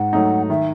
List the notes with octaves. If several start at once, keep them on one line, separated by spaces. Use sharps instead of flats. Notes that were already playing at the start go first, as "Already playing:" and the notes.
Already playing: G#2 F#5
F#3 A3 D#4
D#3 E5